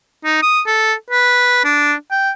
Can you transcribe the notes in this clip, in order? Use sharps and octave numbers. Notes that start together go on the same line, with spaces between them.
D#4
D#6
A4
B4
D4
G5